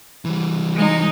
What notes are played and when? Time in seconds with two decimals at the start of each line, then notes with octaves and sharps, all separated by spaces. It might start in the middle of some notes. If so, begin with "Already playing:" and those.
0.25 E3 G3
0.74 G#3 D#4